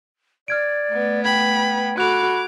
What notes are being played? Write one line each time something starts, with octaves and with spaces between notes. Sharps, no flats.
D5 F6 G#6 D7
A3 B3
G5 B5 G#6
F#4 A4 B5 D6 F#6 F7